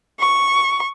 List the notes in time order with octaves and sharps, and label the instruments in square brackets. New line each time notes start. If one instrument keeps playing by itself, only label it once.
[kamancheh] C#6